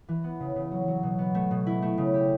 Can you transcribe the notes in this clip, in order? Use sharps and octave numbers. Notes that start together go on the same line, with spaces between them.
E3
B3
C#3
C#3
F#3
F#3
B2
B3
A3
B2
E4
A3
C#3
G4